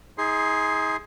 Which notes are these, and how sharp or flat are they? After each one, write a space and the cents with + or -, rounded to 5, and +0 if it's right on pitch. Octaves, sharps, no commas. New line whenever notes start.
D#4 +40 G#4 +0 C6 +0